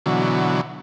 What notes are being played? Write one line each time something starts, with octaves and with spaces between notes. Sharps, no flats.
B2 D3 E3 F#3